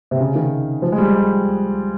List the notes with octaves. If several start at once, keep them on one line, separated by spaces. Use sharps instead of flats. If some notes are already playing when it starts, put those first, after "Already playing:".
C3
C#3
D#3
F3
G#3
G3